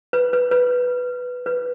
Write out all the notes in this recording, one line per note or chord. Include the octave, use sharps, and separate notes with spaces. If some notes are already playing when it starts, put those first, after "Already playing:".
B4
B4
B4
B4